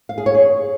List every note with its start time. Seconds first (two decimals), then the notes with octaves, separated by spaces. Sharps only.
0.09 F5
0.18 G#4
0.26 C#5
0.35 G#4